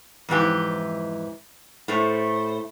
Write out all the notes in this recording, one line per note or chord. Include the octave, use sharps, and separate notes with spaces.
F2 G#2 E3 G4
A2 A3 C5